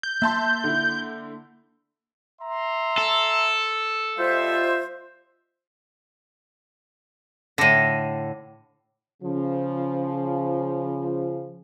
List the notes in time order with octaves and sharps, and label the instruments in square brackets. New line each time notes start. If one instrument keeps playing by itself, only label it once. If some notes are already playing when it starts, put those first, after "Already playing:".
[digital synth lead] G6
[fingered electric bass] A#3 [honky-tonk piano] E5 A5 C6
[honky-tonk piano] D3 E4
[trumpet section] E5 A#5 C6
[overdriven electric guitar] A4
[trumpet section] G3 D#5 E5 [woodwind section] F4 C5
[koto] A2 D3 [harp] A#6 D#7
[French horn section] C#3 F3